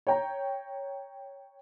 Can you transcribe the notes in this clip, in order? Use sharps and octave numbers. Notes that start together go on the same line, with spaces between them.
C#5 G5 A#5